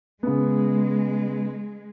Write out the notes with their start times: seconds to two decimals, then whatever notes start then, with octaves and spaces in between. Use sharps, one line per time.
0.23 C#3 G#3 B3